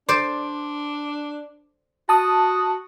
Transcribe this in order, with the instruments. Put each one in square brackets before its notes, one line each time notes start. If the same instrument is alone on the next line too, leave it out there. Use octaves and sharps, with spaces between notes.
[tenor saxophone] D4 [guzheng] C5 D5
[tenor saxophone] F#4 [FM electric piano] A5 D#6